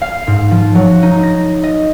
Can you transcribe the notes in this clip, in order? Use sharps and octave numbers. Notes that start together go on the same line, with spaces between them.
F5
G#2
F3
F#3
D#4
A#6
D#5